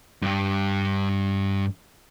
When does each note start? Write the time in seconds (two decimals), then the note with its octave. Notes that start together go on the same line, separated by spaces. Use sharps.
0.22 G2 G4